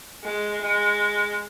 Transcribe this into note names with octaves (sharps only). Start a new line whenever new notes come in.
G#3
G#3